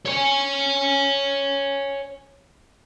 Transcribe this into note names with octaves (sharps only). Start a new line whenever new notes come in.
C#5 G#5